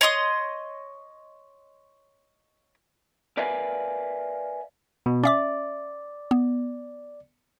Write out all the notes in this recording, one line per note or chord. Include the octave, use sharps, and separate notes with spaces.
C#5 D#5 C6 D#6
A#4 B4 D5 E5 F5 G#5
B2
C#4 D5 E5 D6
B3